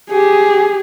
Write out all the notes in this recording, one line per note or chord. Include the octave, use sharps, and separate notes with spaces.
G4 G#4